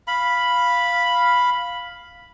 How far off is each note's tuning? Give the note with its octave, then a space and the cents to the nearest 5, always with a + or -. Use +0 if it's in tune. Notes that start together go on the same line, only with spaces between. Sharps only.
F5 +0 B5 +0